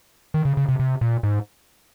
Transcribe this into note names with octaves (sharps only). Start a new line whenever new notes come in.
D#3
C#3
C#3
C3
C3
A#2
G#2